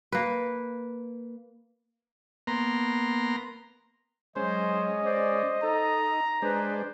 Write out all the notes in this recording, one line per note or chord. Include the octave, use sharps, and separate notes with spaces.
A#3 B4
A#3 B3 A#5 C6
F#3 G#3 C#4 C5 D#5
C5 D5
D#4 A4 A#5
G#3 D4 B4 C5